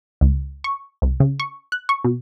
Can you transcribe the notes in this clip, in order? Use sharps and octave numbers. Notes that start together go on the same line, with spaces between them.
C#2
C#6
C2
C#3
C#6
F#6
C#6
B2